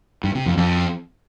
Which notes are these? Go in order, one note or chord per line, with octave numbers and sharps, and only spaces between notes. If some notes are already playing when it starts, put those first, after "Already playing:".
G2
C3
F2
F2